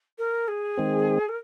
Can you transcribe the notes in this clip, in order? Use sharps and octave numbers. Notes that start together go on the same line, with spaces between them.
A#4
G#4
D#3 G#3 C4
A#4